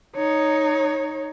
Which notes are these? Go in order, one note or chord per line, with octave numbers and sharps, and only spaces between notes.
D#4 C#5